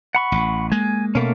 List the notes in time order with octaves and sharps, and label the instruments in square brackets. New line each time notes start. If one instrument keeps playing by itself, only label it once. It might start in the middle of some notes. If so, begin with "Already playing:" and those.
[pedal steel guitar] F#5 B5 C#6
[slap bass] A1
[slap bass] G#3 A#3 [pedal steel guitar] G#5
[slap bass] B2 [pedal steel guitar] A3 A#3 C#4